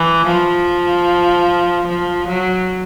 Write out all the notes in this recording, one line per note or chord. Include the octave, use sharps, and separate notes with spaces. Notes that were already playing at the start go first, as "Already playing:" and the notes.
Already playing: E3
F3
F3
F#3